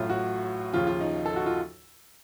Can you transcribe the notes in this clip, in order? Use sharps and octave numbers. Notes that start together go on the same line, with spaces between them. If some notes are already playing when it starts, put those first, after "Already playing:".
Already playing: A1 A2 F#3 F4
F#4
D#2 C#3 F3 F4
F4
D#4
A4
F#4
F4